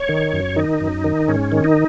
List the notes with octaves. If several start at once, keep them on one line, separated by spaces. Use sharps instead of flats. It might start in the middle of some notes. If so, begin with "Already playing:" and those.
Already playing: C#5
D#3
F#2
D#3 D#4
F#2
D#3
G#2 C#4
D#3
D#4